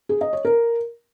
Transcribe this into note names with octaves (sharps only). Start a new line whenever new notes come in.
G#4
D#5
C#5
A#4